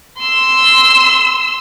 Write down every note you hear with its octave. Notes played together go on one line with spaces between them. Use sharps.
C6 E6